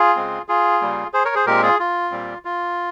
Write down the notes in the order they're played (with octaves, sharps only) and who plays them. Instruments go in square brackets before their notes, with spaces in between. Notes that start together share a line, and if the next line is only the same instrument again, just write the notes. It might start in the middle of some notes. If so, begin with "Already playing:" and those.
Already playing: [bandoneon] F4 G#4
C#3 G#3 C4
F4 G#4
C#3 G3 A#3
G#4 C5
A#4 C#5
G#4 C5
A#2 G#3 C4 G4 A#4
F4 G#4
F4
A#2 G3 C4
F4